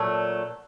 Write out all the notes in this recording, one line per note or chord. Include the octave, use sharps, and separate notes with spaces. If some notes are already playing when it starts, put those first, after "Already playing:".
Already playing: A#2 F#3 A3